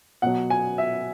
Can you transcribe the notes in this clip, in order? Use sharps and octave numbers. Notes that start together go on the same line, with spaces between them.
B2 F#3 F#5
G#5
E5